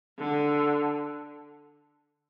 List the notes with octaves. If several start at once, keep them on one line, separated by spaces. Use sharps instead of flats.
D3